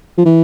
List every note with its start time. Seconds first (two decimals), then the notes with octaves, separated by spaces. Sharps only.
0.18 F3
0.26 E3